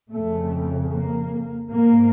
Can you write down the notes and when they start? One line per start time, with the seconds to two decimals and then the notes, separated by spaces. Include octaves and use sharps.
0.12 F2 C#3 A3
0.91 A#3
1.70 G#2 A#3